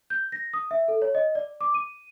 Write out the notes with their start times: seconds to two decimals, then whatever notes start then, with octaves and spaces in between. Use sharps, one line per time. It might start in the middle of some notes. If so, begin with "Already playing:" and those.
0.10 G6
0.32 A#6
0.54 D#6
0.71 E5
0.88 A4
1.02 C#5
1.15 D#5
1.35 D5
1.61 D6
1.74 D#7